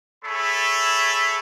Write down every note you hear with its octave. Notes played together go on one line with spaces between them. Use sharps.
A3 G#4 A4 C#5 E5 B5